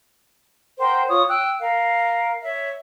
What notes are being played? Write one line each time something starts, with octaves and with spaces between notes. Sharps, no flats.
A#4 C5 F#5 G5
F4 C#5 C#6 D#6
G5 E6 F#6
A#4 F5
C#5 E5